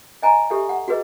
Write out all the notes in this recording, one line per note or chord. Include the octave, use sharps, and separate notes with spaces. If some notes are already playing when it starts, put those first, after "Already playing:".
D#5 G#5 A#5
G4 A4 E5
F#5
F#4 G#4 B4 D#5